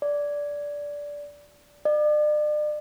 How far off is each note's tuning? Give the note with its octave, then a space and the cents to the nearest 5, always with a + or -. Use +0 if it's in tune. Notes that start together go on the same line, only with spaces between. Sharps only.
D5 -10
D5 +40